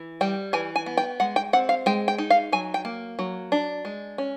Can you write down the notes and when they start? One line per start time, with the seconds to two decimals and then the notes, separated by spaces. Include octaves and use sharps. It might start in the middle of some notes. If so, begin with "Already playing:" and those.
Already playing: E3
0.21 G3 G5
0.53 E3 G#5
0.76 G#5
0.86 B3
0.97 G5
1.20 G#3 F#5
1.36 G5
1.53 C4 F#5
1.69 F5
1.86 G#3 G5
2.08 G5
2.18 D#4
2.30 F5
2.52 F#3 G#5
2.74 G5
2.85 A#3
3.19 F#3
3.52 D4
3.85 G#3
4.18 C#4